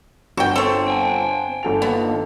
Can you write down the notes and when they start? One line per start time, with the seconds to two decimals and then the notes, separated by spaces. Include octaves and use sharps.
0.37 G1 F#4 G5
0.56 C4 A4 C#5
0.88 G5 G#5
1.63 G1 A4 F7
1.82 D#2 B3